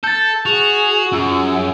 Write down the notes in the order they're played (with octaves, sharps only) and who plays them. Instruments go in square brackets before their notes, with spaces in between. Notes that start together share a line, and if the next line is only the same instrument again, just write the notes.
[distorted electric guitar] A4 [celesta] G6 A6
[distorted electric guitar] F#4 [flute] G#4 [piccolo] F7
[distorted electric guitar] F#2 [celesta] F4 [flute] G#4 [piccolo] E6